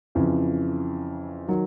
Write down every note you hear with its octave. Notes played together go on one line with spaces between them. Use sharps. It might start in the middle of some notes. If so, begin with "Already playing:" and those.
F2 C#3 E3
D#3 F#3